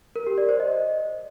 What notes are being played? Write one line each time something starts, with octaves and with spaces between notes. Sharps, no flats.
A#4
G4
D5
C5
D#5